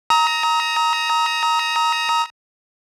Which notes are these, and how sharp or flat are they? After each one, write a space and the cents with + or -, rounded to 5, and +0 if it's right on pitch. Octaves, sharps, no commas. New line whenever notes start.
A#5 +0 D#6 +40